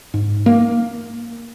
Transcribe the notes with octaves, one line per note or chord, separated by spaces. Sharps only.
G#2
A#3